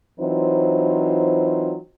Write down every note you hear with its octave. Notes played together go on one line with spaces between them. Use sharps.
E3 F#3 C4 D#4 F4 C5